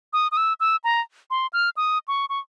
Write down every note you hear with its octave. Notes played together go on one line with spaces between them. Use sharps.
D#6
D#6
E6
E6
A#5
C6
F6
D#6
C#6
C#6